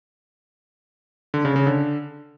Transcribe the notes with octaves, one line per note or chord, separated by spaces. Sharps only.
D3
C#3
C#3
D3